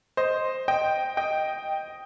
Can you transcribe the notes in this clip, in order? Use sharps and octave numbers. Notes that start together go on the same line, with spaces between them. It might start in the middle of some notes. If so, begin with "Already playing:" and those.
C5 D#5
D#5 G5
D#5 G5